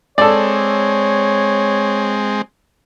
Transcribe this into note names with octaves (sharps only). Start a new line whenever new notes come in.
G#3 C4 A4 C#5 D5